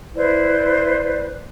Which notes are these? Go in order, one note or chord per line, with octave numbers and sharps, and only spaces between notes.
E4 B4 C5 D5